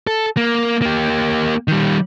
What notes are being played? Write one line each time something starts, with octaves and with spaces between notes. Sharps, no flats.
A4
A#3
A#3 G4
D#3 G3